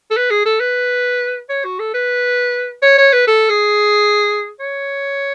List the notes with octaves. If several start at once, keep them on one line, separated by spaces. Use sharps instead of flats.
A4
B4
G#4
A4
B4
C#5
F#4
A4
B4
C#5
C#5
B4
A4
G#4
C#5